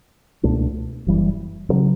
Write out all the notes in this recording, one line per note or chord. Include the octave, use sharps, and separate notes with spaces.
C#2 B2 A3 D4
F#1 F#2 E3 G3
D2 C#3 F#3 C#4